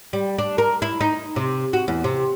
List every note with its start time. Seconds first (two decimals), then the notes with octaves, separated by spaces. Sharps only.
0.13 G3
0.38 D4
0.58 A#4
0.82 E4
1.01 D#4
1.36 C3
1.73 F#4
1.88 E2
2.04 C3